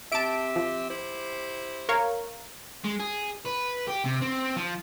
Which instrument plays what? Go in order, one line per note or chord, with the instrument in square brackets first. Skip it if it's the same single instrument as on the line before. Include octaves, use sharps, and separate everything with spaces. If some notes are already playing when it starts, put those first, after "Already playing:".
[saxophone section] C4 G4 E5 [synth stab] A5 D7
[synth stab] F3
[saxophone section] E4 G4 C5
[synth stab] A#4 C#5 F5
[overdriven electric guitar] G#3
G#4
B4
G4
C3
C4
F3